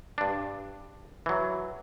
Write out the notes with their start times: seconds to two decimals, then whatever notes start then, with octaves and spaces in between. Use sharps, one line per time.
0.18 G2 D4
1.26 E3 F#3